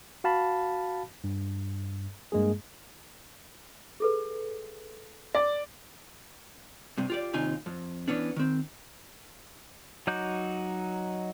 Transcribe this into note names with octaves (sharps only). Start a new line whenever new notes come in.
F#4 F5 A5 B5
G2
G2 G#3 A#3 G#4
G#4 A4 B4
D5
G2 C3
F4 G4 D5
D#2 C3 D#4 F4 G#5
F2
E3 B3 C#4 D4
D#3 C4
F#3 D#4 F#4 D6 G6